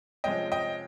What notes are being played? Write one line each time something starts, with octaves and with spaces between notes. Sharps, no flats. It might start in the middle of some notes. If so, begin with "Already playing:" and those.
C3 F3 G#3 C#4 D#5 G5
D#5 G5